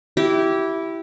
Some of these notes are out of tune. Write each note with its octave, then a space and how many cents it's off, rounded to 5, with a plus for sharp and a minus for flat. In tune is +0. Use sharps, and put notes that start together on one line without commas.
E4 +0 G4 -20